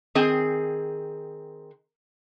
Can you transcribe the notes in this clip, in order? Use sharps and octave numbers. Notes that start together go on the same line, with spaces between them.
D#3 C4 G#4 G#5